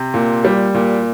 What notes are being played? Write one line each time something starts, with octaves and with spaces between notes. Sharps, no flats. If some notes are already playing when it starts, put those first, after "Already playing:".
Already playing: C3
A#2
G3
A#2